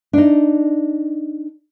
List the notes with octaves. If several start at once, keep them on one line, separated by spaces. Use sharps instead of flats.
D4 D#4